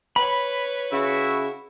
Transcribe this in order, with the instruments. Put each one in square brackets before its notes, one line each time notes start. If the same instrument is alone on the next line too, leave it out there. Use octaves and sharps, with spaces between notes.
[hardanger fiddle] B4 C#5 [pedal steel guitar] B5
[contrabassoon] C#3 [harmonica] E4 F#4 E5